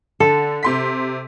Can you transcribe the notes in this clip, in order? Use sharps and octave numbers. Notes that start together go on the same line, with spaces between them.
D3 A4
C3 C6 B6